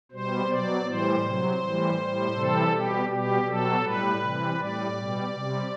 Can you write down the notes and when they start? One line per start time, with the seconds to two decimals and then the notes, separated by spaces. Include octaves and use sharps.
0.12 B2 G3 C5
0.48 B2 F#3 D5
0.86 A2 E3 G3 C5
1.23 C3 F#3
1.60 A2 E3 G3
1.97 A2 G3
2.34 C3 E3 G3 A4
2.72 B2 G3 G4
3.09 B2 G3 G4
3.46 B2 F#3 A4
3.83 A2 G3 B4
4.20 C3 E3 G3
4.57 A2 G3 D5
4.94 B2 G3
5.32 C3 G3